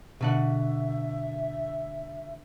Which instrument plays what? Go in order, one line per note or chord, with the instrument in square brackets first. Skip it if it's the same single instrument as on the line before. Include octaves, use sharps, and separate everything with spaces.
[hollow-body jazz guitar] B2 D3 F#5 [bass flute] E5